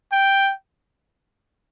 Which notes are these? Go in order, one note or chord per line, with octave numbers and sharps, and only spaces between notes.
G5